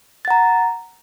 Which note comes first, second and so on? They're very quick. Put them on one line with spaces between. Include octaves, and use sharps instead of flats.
A6 F#5 A#5